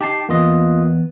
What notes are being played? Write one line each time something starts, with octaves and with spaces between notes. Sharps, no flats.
D#4 G4 A5 C7
E2 A#3 B3 F4 D#5